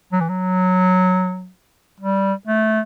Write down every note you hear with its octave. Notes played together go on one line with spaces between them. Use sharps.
F#3
E3
F#3
G3
A3